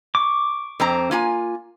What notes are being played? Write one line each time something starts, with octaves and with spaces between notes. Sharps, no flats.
C#6 D6
F2 C4 A#5
A#3 F4 G#5